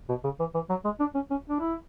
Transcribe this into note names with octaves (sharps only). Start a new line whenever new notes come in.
B2
C#3
E3
E3
F#3
G#3
D4
C#4
C#4
D4
E4